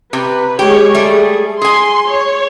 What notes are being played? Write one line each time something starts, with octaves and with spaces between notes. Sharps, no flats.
C3 B4
G#3 G4 G#4 C#5
G3 A3 G#4
G#4 G#5 C6
C#5